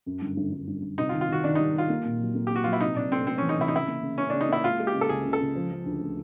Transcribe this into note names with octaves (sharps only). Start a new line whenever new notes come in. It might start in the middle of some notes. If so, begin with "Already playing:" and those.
F#2
G1
G1
G1
G1
G1
C3 D#4
F4
D#3
F4
D#3 F#4
D#3 D4
D#4
G3
G3 F4
A#3
A#2
F#3
A#3
A#3 G4
F#4
F#3 F4
E4
C3 D#4
C3 D4
A3 C4
A3 C4
C#4
E3
D#4
C3 E4
D#4
C#3 E4
A#3
C#3
A#3 C#4
C#3 D4
D#4
A#3 E4
G#3 F4
G#3
G4
C#3
A4
C#2 G#4
C#3
A4
C#2
F3
F3
D2
A3